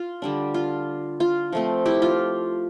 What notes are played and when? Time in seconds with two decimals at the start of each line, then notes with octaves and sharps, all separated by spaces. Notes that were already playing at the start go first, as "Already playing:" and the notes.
Already playing: F4
0.22 D3 G3 D4
0.54 F4
1.20 F4
1.52 F3 A3 C4
1.86 E4 G4
2.02 F4